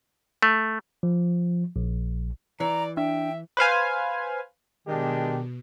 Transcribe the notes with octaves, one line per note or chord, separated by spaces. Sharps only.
A3
F3
A#1
E3 D5 A#5
D4 E5 G5
B4 C5 F5 G#5
B2 D#3 G#3 D4 G4